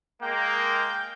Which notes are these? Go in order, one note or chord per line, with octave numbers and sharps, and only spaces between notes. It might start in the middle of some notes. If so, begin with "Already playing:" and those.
G#3 A#3 G5